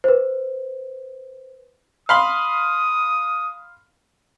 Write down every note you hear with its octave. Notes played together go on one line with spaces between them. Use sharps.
B4 C5
F5 B5 C6 D#6